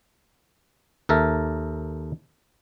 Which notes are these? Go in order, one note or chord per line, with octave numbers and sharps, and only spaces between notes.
D#2 A4 A#4 E5